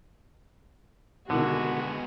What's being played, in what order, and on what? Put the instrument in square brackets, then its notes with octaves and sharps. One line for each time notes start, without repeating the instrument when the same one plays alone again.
[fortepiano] C2 B2 D#3 [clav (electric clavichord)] D3 [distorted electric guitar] G#3 B3 [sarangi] F#4